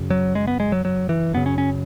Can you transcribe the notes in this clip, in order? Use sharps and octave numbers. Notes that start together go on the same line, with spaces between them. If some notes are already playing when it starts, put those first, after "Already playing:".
Already playing: F#2 C#3
F#3
G#3
B3
G#3
F#3
F#3
E3
F#2 C#3 B3
C#4
C#4